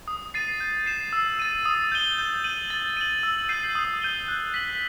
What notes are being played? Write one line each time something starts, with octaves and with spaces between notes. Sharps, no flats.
D#6
A6 C7 D#7
G6
C7 E7
E6
A6 D#7
D#6
G6 D#7 G7
G6
D#7 F#7
A6
D#7 F#7
E6
G6 C7 D#7
D#6
G6 D#7 G7
F#6
B6 F#7